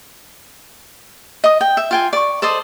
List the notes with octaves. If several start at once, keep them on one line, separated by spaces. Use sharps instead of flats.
D#5 D#6
G5
E5
F4 G5 G#5
D5 C#6
A4 C5 D5 D#5